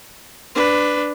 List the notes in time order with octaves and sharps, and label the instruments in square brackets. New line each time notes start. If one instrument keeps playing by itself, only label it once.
[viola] D4 B4